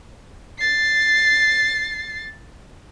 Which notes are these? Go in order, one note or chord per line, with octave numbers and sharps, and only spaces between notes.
A6 C7